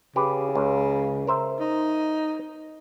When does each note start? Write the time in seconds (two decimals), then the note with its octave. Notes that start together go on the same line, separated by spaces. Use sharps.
0.16 C#3 G4 B4
0.55 C#2
1.27 A#4 C5 E5
1.60 D#4